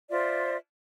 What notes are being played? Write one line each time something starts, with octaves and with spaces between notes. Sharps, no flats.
F4 C5 D5 E5